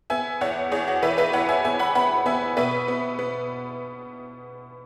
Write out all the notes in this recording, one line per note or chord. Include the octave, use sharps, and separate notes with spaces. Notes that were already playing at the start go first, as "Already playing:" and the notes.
B3 E5 G#5
E2 C#5 F#5
E2 G#4 C#5
F#4
E3 B4 E5
B4 E5
E2 C#5 F#5
E5 G#5
B3 E5 G#5
F#5 B5
B3 F#5 B5
B3 E5 G#5
B2 B4 E5
B3
B3